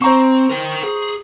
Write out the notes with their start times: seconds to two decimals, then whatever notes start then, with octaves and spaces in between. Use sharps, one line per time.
0.02 C4 C5 A#5 C#6
0.50 A#4 G5
0.84 G#4